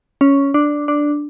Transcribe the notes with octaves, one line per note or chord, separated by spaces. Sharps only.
C#4
D4
D4